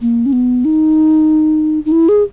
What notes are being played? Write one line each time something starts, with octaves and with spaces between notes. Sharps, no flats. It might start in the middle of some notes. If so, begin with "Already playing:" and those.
A#3
C#4
B3
D#4
D#4
E4
G#4